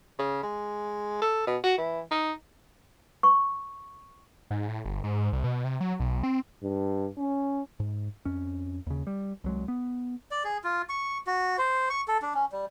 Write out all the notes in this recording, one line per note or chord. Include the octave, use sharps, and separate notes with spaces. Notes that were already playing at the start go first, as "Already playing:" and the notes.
C#3
G#3
A4
B2
F#4
E3
D#4
C#6
G#2
A2
G1
G#2
C2
B2
C3
F#3
B1
C4
G2
C#4
G#2
F2 C#4
D#2 C#3
G3
C2 F#3 G#3
B3
D5
G#4
F4
C#6
F#4
C5
C#6
A4
D4
C#4
G3